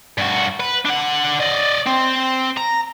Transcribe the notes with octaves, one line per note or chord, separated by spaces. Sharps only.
G2 F#4
B4
D4 F#5
D5 D#5
C4
A#5